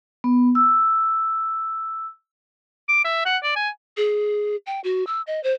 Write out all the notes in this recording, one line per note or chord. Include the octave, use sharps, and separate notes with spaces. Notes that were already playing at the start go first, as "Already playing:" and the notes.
B3
E6
D6
E5
F#5
D5
G#5
G#4
G5
F#4
E6
D#5
C5